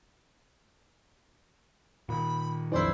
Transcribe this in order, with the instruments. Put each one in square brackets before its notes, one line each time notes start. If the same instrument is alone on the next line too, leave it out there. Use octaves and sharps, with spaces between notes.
[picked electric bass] A#2 D#3 [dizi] B5
[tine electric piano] B1 F2 E3 [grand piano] D4 E4 [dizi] C5